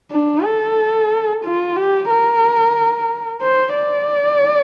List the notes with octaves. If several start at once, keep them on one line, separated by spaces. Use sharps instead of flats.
D4
A4
F4
G4
A#4
C5
D5